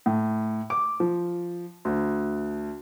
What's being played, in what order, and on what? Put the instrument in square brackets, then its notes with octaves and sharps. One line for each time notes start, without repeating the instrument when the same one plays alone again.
[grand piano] A2
D6
F3
D2